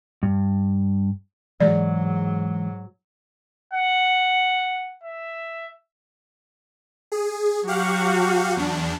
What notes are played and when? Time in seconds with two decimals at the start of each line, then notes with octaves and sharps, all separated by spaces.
0.23 G2
1.60 G#2 C3 E3 F#3 G#3 D5
3.73 F#5
5.03 E5
7.12 G#4
7.67 F#3 F#4 G4 F5 F#5
8.57 E2 D4